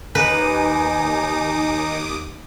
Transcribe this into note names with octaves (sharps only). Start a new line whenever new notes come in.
D#2 D#4 B4 G#5 D6 D#6